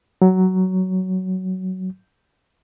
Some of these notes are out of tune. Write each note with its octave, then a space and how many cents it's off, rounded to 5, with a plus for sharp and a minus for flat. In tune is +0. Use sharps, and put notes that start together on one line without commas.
F#3 +10